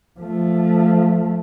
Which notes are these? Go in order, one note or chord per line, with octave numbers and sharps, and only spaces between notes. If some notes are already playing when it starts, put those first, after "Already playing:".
F3 A3